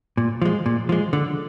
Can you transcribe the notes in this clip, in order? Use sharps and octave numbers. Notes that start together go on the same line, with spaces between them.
A#2
F3 G#3
A#2
F3 G#3
D3